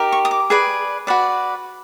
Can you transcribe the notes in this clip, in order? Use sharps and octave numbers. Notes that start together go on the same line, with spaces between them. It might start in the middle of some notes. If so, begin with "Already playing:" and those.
Already playing: D#4 G4 A#4
C#6
D#6
D6
G#4 B4 D5
F#4 B4 D5